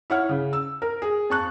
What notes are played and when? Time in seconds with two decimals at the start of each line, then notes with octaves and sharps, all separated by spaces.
0.10 E4 C#5 F#5 F6
0.29 C#3
0.53 E6
0.82 A#4
1.02 G#4
1.30 F2 A5 C#6 F#6